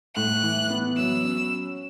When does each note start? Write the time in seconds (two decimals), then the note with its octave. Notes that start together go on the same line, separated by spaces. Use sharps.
0.16 A2 F#6
0.43 E3
0.70 B3
0.97 F#3 E6
1.25 C#4